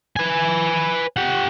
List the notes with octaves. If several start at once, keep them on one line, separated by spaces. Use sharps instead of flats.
B4 G#5
G4 F#5